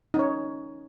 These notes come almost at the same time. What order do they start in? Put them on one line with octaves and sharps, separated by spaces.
D#4 C#4 C#5